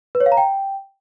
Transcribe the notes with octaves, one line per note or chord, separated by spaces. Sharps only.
B4
C#5
F5
A#5
G5